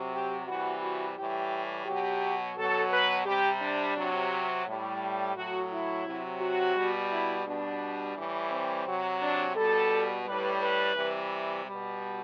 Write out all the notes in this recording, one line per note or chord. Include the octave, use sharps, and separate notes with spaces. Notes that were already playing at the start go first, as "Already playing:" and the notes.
Already playing: C3 F#3
G4
C3 E3 G3 F#4
F#4
A2 E3 G3 G4
B2 F#3 G4
B2 F#3 A4
B4
C3 G3 G4
D4
C3 F#3
A2 G3
A2 F#3 F#4
E4
C3 F#3
F#4
B2 G3
E4
B2 G3 D4
A2 E3 G3
C4
C3 F#3
D4
B2 G3 A4
A2 G3 B4
B4
C3 E3 G3
B2 G3